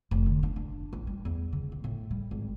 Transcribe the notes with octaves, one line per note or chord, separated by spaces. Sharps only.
F1
D3
D4
D4
A1
G3
E2
C#3
A1
A2
G3
G#1